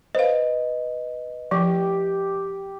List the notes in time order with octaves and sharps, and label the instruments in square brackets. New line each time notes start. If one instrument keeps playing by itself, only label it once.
[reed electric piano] B4 D#5 [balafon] C5 F5
[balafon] F3 [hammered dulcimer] G4